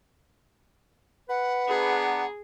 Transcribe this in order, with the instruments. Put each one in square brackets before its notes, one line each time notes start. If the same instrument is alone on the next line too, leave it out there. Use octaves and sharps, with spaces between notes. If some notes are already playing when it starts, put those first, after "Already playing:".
[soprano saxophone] B4 [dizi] F#5
[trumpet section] B3 D4 A#5 [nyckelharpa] G#4